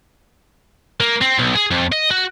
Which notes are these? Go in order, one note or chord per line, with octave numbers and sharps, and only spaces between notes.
A#3
C4
B1
G#4
F2
D#5
F#4